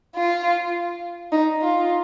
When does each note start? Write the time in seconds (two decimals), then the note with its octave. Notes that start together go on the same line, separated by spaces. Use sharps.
0.16 F4
1.32 D#4
1.62 F4